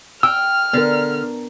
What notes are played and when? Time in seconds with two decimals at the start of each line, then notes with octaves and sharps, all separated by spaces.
0.23 G5 E6 F6
0.73 D3 B3 A#4